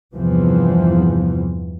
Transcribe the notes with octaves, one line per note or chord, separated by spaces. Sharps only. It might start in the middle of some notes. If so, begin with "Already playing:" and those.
E2 G2 C3 E3 F3